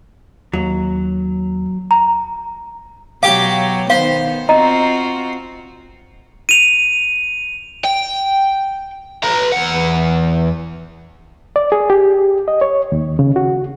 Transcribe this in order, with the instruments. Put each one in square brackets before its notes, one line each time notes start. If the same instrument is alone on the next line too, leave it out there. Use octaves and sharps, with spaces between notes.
[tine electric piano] D#2 [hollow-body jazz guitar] F#3
[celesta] A#5
[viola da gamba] B2 F#3 [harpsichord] G4 D6 [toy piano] F5
[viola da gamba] D#3 B3 [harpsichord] C5 [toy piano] F5
[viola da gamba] C4 F4 F#4 [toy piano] D#5 A#5
[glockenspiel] D#7 F7
[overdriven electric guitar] G5
B4 A#5
E2 F#5
[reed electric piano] D5
G#4
G4
D#5
C#5
D#2
C#3
F#4